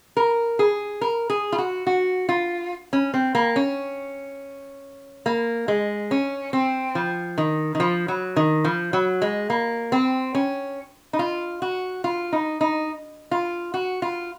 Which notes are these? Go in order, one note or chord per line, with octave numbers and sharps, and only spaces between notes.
A#4
G#4
A#4
G#4
F4
F#4
F#4
F4
C#4
C4
A#3
C#4
A#3
G#3
C#4
C4
F3
D#3
D#3
F3
F#3
D#3
F3
F#3
G#3
A#3
C4
C#4
D#4
F4
F#4
F4
D#4
D#4
F4
F#4
F4